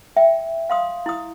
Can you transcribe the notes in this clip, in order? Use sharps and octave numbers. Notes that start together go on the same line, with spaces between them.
E5 G5
F5 C6 D#6
E4 D#6